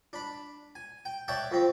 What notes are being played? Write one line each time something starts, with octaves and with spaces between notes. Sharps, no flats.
D4 B5
G#5
G5
C#5 D5 E5 F#5 G5 A5
F2 C4